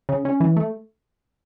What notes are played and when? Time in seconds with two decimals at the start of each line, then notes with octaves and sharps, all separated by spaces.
0.09 C#3
0.25 C#4
0.40 E3
0.57 A3